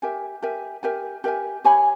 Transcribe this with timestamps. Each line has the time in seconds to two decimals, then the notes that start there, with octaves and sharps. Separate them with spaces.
0.02 G4 A#4 E5 G#5
0.42 G4 A#4 E5 G#5
0.83 G4 A#4 E5 G#5
1.24 G4 A#4 E5 G#5
1.64 G4 C#5 G#5 B5